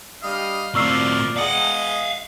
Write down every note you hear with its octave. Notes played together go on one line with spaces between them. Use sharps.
G3 D4 D#5 F5 D#6
A2 F3 C4 A#4 D5 C#6 E6 C7
G#3 B3 G#4 D#5 F5 F#5